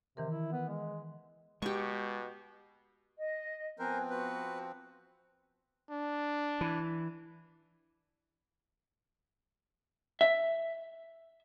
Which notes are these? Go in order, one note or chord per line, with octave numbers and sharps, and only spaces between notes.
C3 D#3 E3 A#4
E4
B3
G#3
B2 G#3 G4 C#6
D#5
F3 B3 C4 A#4 C5 G#5 F#6
F#4 B4 C5
D4
E3
E5